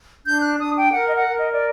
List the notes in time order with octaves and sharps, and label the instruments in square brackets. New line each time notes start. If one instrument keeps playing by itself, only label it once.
[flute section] D4 G6
F#6
D4 D#6
G5
A#4 F#5
D#5
F#5
A#4
D#5
D5